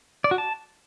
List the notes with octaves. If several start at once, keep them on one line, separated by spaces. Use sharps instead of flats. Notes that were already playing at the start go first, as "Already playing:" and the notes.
D5
F#4
A5